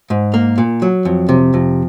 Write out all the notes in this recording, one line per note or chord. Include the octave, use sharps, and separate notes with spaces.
G#2
A#3
A#2
F#3
F2
C3
F2